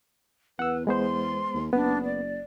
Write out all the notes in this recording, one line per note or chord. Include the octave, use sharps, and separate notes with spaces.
E2 B4 F#5 E6
G#3 B3 C5 C6
D#2
F#1 B3 D4
D5